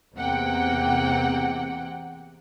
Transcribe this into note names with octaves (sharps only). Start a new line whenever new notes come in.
E2 C3 A#3 F#5 G5